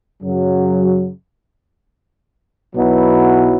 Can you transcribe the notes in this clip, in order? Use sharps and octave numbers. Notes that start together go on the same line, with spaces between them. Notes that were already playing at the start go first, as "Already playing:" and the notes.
F#2 C#3 F#3
B1 B2 F#3 B3 E4